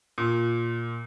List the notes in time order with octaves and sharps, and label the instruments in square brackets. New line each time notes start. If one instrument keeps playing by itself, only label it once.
[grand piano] A#2